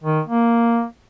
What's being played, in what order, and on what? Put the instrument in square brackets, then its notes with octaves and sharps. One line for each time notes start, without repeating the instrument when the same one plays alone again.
[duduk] D#3
A#3